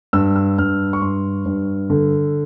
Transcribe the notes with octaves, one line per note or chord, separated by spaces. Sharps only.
G2 E6
E6
G2 F6
C#6
G2 C6
G2
D3